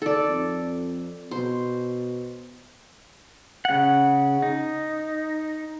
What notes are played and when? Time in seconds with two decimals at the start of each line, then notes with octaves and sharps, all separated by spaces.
0.02 D#3 A4 D5
0.28 F2
1.31 B2 C5
3.65 C#3 F#5
4.42 D#4